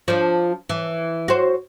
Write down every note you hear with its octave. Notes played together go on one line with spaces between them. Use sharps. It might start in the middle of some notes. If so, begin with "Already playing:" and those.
F3 D4
E3
F#4 C5